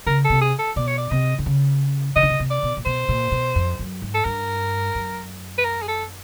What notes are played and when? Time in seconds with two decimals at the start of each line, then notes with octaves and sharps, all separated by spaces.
0.07 C#3 A#4
0.25 A4
0.30 C3
0.41 G#4
0.59 A4
0.76 B2 D5
0.87 C#5
0.98 D5
1.11 C3 D#5
1.39 D3
1.46 C#3
2.16 C#3 D#5
2.23 D3
2.30 C#3
2.40 C3
2.50 D5
2.62 B2
2.77 A#2
2.86 B2 C5
3.09 A#2
3.32 B2
3.55 F2
3.79 F#2
4.02 G#2
4.14 A4
4.25 G2 A#4
4.95 F#2
5.58 B4
5.65 A#4
5.82 G#4
5.88 A4